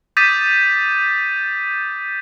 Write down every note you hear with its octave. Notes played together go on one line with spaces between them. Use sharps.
D6 D#6 G6 A6 B6 D#7